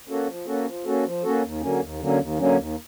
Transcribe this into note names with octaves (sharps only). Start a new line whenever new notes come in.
A#3 C#4 F#4 A4
F3
A#3 C#4 F#4 A4
F3
A#3 C#4 F#4 A4
F3
A#3 C#4 F#4 A4
D#2
D3 F#3 A#3 C#4
D#2
D3 F#3 A#3 C#4
D#2
D3 F#3 A#3 C#4
D#2